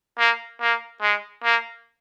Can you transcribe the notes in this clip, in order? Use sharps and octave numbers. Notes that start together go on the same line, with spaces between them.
A#3
A#3
G#3
A#3